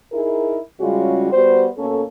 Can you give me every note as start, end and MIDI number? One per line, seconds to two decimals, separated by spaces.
0.12 0.57 63
0.12 0.57 64
0.12 0.57 68
0.12 0.57 70
0.80 1.29 49
0.80 1.29 55
0.80 1.29 56
0.80 1.29 61
0.80 1.29 65
0.80 1.29 66
1.33 1.68 55
1.33 1.68 59
1.33 1.68 66
1.33 1.68 72
1.78 2.03 47
1.78 2.03 58
1.78 2.03 61
1.78 2.03 69